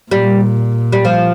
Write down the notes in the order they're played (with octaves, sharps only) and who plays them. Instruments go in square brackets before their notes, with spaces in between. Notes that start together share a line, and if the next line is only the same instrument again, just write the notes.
[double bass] A#2 [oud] G3
[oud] G3
F3